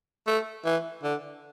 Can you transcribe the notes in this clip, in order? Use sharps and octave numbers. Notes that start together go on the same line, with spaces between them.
A3
E3
D3